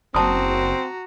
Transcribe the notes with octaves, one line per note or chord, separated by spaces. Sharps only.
F#1 C4 F#4 A5 A#5 D#6